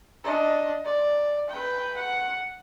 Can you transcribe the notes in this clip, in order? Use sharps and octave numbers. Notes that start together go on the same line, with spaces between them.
D4 D#5
D5
B4 G5
F#5